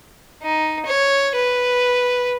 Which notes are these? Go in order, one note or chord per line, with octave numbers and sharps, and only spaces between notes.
D#4
C#5
B4